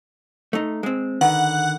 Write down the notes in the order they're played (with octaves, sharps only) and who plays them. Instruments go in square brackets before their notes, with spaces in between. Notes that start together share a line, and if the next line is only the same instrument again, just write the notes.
[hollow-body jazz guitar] A3 D#4
G#3 C4
[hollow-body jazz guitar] D3 D#3 B4 [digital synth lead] F#5